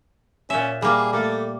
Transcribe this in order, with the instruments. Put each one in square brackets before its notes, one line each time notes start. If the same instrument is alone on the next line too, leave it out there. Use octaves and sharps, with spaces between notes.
[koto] A#2 E5 [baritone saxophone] C#4
[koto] G3 A#3 [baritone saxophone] G#4
[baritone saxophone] A3 [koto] A#3